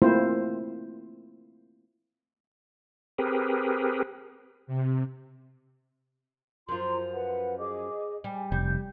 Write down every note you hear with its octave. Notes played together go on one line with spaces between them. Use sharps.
A3 A#3 C4 E4 F4 C5
C4 G4 G#4 A#4 B4
C3
F#2 F3 F4 A#5 C6
B4 F#5
G#4 D#5 D6
G3 G#5
F1 G3 G6